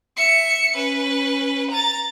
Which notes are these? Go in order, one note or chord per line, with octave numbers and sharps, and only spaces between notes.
E5 C#7
C#4 B4
A#5 A6